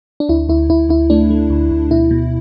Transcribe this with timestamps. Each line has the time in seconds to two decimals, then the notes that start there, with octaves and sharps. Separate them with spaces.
0.20 D4
0.29 D2 E4
0.49 D2 E4
0.70 D2 E4
0.89 D2 E4
1.10 A3 D4
1.30 A3
1.50 D2
1.71 D2
1.91 B2 E4
2.11 B2